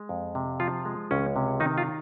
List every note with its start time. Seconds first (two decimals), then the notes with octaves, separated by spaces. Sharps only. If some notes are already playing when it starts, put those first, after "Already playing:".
Already playing: G#3
0.09 F2
0.35 C3
0.60 F3 F4
0.85 G#3
1.11 C#2 C#4
1.36 C3
1.60 D#3 D#4
1.78 F4